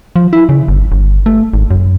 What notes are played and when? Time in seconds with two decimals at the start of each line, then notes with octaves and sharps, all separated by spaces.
0.16 F3
0.33 E4
0.49 C#3
0.68 G1
0.92 G1
1.26 A3
1.54 G#1
1.71 F#2